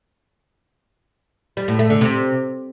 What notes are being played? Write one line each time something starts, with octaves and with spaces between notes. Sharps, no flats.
G3
A2
A3
D3
C3